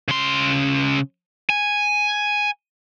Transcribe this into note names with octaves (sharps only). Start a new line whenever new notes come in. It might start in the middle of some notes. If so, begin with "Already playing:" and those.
C#3 C6
G#5